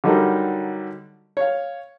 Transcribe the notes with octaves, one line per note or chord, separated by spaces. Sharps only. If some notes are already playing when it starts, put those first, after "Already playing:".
D3 F#3 G3 D#4 A4 A#4
C#5 F5